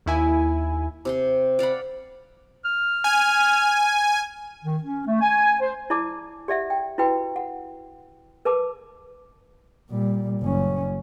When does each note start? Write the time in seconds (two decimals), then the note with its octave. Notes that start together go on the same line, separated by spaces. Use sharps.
0.06 D#2 E4 G#5
1.05 C3 G4 C6
1.59 D5 F5 F#5 B5
2.65 F6
3.04 G#5
4.64 D#3
4.83 C#4
5.07 A3
5.22 G#5
5.60 C5
5.90 E4 D5 A5 D6
6.48 G4 D5 E5 F#5
6.70 G5
6.98 E4 F#4 B4 G5
7.36 F#5
8.45 A#4 B4 A5 D6
9.90 A#2 G3
10.41 F#1 C#4